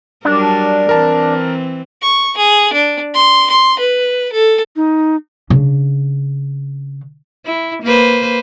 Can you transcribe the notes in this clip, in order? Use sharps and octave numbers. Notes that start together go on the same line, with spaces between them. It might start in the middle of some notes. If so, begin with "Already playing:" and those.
F#3 G3 D4 A#4
E3 C4 A#4 A5
C#6
G#4
D4
C6
C6
B4
A4
D#4
C#3 D4
E4
A#3 B4 C5